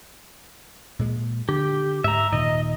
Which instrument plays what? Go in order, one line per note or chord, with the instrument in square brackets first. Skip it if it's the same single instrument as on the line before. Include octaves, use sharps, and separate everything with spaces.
[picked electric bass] A#2 G#3
[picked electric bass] D3 [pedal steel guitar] G4
[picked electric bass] G#2 [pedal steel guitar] E5 A#5
[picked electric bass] D#1 A#2 D#3 [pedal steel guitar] D#5